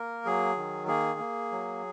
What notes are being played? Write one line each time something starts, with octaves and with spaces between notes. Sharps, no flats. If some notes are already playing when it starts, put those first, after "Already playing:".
Already playing: A#3 A#4
F#3 G#4
D#3
A#3 G#4
A#3
F#3